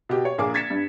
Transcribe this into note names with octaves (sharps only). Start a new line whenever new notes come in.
B2 G4
C#5
A#1 A#3 G#4 D6
G#6 A6 B6 C#7 E7
G2